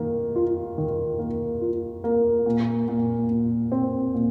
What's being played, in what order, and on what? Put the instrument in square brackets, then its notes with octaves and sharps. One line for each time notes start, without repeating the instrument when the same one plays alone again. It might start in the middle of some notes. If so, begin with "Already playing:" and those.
Already playing: [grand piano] D#3 A#3
F4
D#3
A#3
F4
A#3
A#2
A#2
A#2
C4
A#2